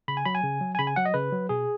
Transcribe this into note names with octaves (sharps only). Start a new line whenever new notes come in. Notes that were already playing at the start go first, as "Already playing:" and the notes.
C#3 B5
G#5
F#3 B5
G#5
C#3
F#3
G#5
C#3 B5
G#5
F#3 F#5
D#5
C#3 B4
F#3
B2 G#4